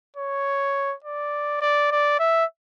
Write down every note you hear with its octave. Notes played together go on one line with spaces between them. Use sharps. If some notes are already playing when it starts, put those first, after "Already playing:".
C#5
D5
D5
D5
E5